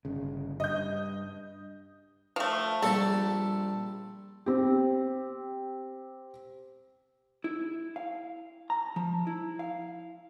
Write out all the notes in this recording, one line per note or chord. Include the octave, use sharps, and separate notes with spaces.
G1 C#3
G2 D#5 G6
F3 A3
A#1 G3 A4 A5
C4 G4
E4
F5
A#5
F3
E4
F5